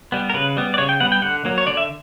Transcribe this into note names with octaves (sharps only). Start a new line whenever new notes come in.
G3 B3
A#4
C#3 B4
G3 B3
D5
C#3 C#5
G5
G3 B3 F#5
G5
D3 F#5
F#3 A#3
C#5
D3 D5
E5